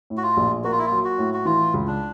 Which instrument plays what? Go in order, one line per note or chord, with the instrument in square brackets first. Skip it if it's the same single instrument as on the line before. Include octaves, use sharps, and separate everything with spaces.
[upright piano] A2
[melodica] F#4
F4
[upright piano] A#1
[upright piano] A#3 [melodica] F#4
[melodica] F4
E4
F4
[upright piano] F#3
[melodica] F#4
[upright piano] A2
[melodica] F#4
[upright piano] E3 [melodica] F4
[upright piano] C#2
[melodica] D4